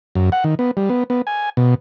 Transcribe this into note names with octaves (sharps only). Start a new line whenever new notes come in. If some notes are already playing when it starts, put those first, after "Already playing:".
F#2
F#5
D#3
B3
G3
B3
B3
G#5
B2